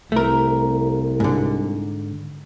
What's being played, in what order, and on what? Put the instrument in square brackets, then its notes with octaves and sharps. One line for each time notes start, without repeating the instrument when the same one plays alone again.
[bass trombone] C2 [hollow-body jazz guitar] A3 A#4
[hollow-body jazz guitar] G#2 D3